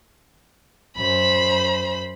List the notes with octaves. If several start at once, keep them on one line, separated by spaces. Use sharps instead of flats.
F#2 C5 B5